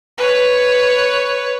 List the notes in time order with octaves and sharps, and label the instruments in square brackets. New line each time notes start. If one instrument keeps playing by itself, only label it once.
[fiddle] B4 C#5